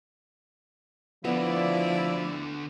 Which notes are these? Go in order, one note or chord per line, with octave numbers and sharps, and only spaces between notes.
D3 F3 B3 E4 F#4 D5